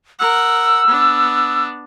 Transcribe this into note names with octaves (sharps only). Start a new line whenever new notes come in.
A#4 F#5 E6
B3 D4